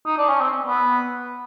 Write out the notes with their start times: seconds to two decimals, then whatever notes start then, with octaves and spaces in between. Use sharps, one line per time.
0.06 D#4
0.18 D4
0.29 C#4
0.40 C4
0.67 B3